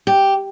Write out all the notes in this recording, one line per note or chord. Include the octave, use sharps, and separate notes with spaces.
G4